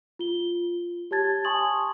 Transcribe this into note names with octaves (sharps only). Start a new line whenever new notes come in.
F4 G7
G4 C#5 A5 G#6 A6
G#5 A5 C6 C#6 D#6 F#7